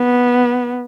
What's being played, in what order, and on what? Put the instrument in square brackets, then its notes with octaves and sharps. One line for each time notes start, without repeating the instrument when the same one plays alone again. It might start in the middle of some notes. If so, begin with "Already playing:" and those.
Already playing: [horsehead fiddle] B3